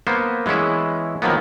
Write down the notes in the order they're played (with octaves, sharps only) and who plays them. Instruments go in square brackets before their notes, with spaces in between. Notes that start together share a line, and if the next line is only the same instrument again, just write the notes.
[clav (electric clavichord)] A#3 B3 C5
E3 G#3 B3 C#4 E4
D#3 F3 F#3 A#3 B3